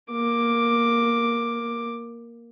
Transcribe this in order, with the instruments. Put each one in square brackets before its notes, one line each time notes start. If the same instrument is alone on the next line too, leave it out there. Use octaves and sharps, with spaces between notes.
[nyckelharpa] A#3 D6